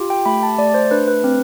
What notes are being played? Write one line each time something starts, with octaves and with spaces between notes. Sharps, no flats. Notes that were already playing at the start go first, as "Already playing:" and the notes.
Already playing: F4 G4
G5
A3 B5
A5
A3 D5
C5
D4 B4
B4
C4